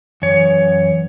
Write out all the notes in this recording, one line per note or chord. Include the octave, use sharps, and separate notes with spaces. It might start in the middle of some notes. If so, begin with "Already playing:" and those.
F#2 E3 C#5